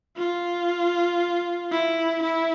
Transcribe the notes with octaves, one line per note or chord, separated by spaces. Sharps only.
F4
E4
E4